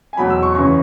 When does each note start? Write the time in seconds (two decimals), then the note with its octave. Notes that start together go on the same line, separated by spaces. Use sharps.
0.13 G#5
0.17 E2 B2 F#3 B5
0.30 E6
0.43 C#6
0.55 F#2 C#3 E3 C#6